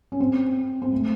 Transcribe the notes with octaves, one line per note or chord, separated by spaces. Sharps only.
C#4
C4
C4
A3